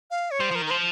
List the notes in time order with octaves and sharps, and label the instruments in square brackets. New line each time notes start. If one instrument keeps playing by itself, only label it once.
[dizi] F5
C#5
[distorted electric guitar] G3 [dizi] C5
[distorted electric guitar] F3 [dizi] A#4
[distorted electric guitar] D#3
[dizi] A#4
[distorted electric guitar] F3 [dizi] C5